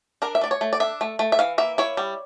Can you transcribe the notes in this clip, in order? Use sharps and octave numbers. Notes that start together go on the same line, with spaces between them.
D4 A#4
E5
A3 D5
C#5
A3
D5
D4 E5
A3
A3
E5
E3 F5
A#3 E5
E4 C#5
G3